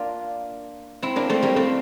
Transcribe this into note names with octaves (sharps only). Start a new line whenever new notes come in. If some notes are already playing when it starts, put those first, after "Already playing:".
Already playing: A#3 D4 F4
C4 E4
A#3 D4
A3 C4
G3 A#3
A3 C4